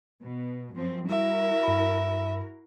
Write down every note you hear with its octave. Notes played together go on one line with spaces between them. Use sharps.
B2
F#2 F3 C4
G3 E4 F#4 A#4 E5
G2 B5